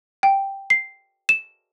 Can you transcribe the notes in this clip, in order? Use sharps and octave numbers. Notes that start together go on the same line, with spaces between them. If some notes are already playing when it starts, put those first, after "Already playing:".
G5
C7
E7